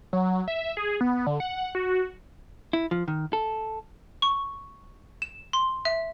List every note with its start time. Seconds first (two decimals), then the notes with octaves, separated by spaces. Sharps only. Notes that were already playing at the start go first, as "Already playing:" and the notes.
0.13 F#3
0.48 E5
0.77 G#4
1.01 B3
1.27 D3
1.40 F#5
1.75 F#4
2.73 E4
2.91 F3
3.08 D#3
3.33 A4
4.22 C#6
5.22 E7
5.53 C6
5.85 E5